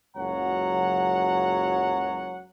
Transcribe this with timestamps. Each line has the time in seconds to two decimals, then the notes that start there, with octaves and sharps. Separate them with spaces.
0.17 F#1 C#2 F#3 C#5 F#5 A#5